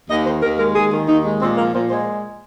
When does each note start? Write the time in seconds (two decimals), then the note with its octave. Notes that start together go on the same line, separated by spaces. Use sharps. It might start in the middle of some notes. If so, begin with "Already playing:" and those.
0.10 D#2 D#5
0.26 D#3 C5
0.43 D#2 A#4
0.59 G#3 A#4
0.75 D#2 G#4
0.92 D#3
1.08 D#2 D#4
1.25 G#3
1.41 A#2 C4
1.57 F3 A#3
1.74 A#2 C5
1.91 G#3 C5